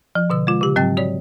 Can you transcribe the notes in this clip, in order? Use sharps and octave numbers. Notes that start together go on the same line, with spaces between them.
F3
B2 D3 E6
G#3 F4
C#3 G4
G#2 F#3 C4 G5 A6
F#4 C#5 D5